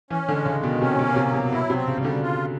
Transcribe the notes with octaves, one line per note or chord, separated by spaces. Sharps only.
E3 C#4
D3
G#3
C#3
D#3
B2
C3 C#4
B2
A#3
C3
F#3
B2
B2 E4
C3
C4
C#3
C#3 G3
D3
F4